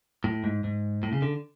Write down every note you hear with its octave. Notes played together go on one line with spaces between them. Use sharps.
A2
G#2
G#2
A2
C#3
D3